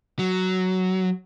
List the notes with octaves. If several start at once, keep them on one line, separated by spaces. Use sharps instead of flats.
F#3